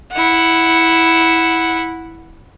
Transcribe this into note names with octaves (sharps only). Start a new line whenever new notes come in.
E4 F#5